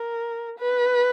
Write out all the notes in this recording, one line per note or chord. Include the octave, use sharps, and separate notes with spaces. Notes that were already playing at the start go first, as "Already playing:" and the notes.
Already playing: A#4
B4